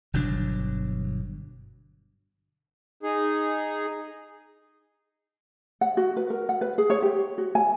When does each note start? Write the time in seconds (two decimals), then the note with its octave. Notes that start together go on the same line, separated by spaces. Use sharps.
0.14 G1 B2 F#3 D4
3.03 D#4 G#4
5.81 F#5
5.97 F#4
6.16 B4
6.30 A#4
6.49 F#5
6.61 B4
6.78 G#4
6.90 C#5
7.02 G4
7.38 F#4
7.55 G#5